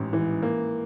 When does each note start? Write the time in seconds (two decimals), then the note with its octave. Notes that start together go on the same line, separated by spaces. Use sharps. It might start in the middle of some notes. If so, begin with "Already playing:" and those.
Already playing: A1 G#2
0.13 E3
0.42 A#3